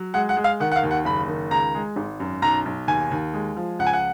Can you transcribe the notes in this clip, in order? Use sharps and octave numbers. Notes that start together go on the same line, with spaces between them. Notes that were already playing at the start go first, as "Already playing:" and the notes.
Already playing: F#3
G#3 F#5
F#5
G#3
F5
D#3 F#5
F#5
F5
D#2
F#5
F#1 B5
D#3
C#2 A#5
G#3
G#1
F#2
B1 A#5
B1
D#2 G#5
D#2
G#3
F3
C#2 F#5
G#5
F#5